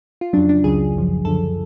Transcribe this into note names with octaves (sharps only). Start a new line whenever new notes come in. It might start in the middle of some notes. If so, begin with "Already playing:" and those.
F4
F2 C#3 F#3 D4
D4
C#2 C#3 F#3 G#4
G#1 F#2 F3
F#2 D3 F3 A4